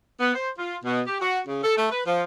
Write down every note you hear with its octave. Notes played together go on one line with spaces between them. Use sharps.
B3
C5
F4
B2
G4
F#4
C#3
A4
A3
B4
F3